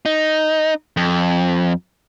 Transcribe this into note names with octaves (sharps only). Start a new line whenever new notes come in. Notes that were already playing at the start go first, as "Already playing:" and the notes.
D#4
F2